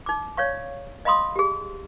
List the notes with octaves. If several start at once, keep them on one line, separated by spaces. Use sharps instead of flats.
D#4 D6
C#5 D5 F5 C#6
D#5 F5 B5 C6 D#6
G4 G#4